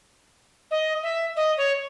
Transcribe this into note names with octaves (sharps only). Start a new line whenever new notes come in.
D#5
E5
D#5
C#5